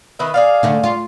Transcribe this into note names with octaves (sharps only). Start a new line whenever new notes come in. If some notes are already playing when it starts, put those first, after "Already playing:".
D#3 B4 E5
G#4 D5 F5
D3 A3 D4
F4